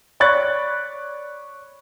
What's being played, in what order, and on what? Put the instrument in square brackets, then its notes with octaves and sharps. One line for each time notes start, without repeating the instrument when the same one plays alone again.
[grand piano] C#5 D5 B5 C#6 F#6 A6